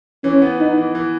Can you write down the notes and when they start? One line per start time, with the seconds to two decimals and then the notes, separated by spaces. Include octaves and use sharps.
0.24 E3 C#4
0.42 B3
0.59 B3 D#4
0.78 E3
0.95 E3